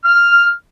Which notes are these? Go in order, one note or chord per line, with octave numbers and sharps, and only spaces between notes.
F6